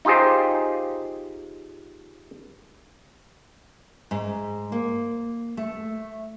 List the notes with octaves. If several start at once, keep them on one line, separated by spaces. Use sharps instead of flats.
D#4 F4 G4 G#4 C5
G#2
A#3
A3